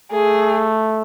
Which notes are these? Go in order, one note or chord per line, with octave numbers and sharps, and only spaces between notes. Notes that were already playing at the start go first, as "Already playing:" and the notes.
A3 G#4